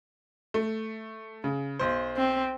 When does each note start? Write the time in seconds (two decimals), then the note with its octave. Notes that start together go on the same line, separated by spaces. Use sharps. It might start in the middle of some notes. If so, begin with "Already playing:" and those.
0.54 A3
1.44 C#3
1.79 B1 C5
2.17 C4